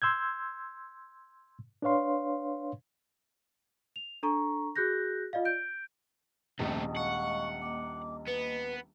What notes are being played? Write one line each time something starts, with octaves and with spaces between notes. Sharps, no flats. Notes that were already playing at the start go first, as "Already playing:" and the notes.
C6 E6 G6 G#6
D4 B4 C#5 F5 C6
F7
D4 A4 A#5 C#6
F#4 G#4 F#6 G6 A#6
F4 D5 D#5 F5
G6 D7
D#1 A#1 C3 A3 D#5 A5 D#6
G#3 D#5 F5 F#5 C#6
A#3 D#5 D6
B3 B4